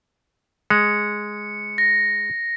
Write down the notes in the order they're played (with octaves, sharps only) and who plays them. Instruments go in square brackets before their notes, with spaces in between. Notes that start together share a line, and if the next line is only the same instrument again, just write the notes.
[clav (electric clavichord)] G#3 [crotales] C#7
[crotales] A#6